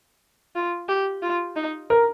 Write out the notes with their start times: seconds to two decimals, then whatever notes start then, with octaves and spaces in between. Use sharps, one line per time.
0.55 F4
0.89 G4
1.22 F4
1.56 D#4
1.90 A#4